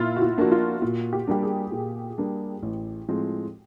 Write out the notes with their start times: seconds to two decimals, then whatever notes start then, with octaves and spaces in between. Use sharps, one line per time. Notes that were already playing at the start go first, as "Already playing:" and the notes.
Already playing: A#2 E4 F4
0.16 F#4
0.22 F4
0.38 F3 A#3 D4 F#4
0.52 F4
0.82 A#2 F#4
1.13 G4
1.27 G3 A#3 D4 G4
1.43 G#4
1.72 A#2
2.18 G3 A#3 D4
2.63 A1
3.08 A2 F3 G#3 C4